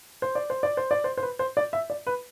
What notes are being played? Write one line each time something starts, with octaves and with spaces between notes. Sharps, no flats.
C5
D5
C5
D5
C5
D5
C5
C5
B4
C5
D5
E5
D5
B4